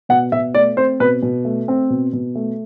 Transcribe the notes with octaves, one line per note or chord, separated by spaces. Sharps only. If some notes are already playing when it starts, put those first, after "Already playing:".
B2 F#5
B2 E5
A3 D5
C4 C5
B2 B4
B2
A3
C4
B2
B2
A3